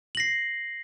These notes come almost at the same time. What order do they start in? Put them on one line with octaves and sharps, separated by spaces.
F#7 A#6 C7